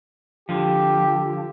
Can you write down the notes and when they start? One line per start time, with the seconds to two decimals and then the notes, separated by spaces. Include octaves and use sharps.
0.49 D3 F3 G4